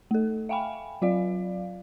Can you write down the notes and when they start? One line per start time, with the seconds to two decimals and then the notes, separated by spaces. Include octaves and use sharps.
0.11 A3 A4
0.49 E5 F5 G5 G#5 B5
1.02 F#3 F4 D5 F5